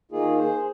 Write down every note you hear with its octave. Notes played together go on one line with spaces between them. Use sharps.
D#3 A#3 D#4 F4 G#4
G#4 C5